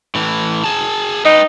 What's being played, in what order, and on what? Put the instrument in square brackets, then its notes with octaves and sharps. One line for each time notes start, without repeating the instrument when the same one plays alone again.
[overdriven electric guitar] A2 E3
G#4 A5
[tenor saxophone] D#4 [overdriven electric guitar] B4 G5